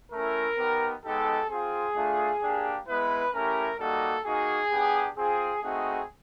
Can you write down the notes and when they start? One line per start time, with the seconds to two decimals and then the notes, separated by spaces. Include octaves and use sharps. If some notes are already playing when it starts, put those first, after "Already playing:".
0.12 A3 C#4 E4 A#4
0.57 B3 D#4 G4
1.04 G#3 B3 D#4 G4 A4
1.49 C4 F4 G#4
1.96 A3 D4 F4
2.42 A#3 D4 G4
2.87 G#3 B3 E4 B4
3.33 A3 C#4 E4 G4 A#4
3.79 G3 A#3 D#4 F#4 A4
4.25 A#3 D#4 F#4 G#4
4.71 B3 D4 G4
5.17 C4 F4 G#4
5.63 A3 C4 D#4 F#4 G#4